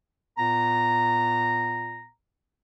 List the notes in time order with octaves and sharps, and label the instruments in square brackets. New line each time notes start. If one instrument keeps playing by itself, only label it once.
[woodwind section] A#2 B3 A#5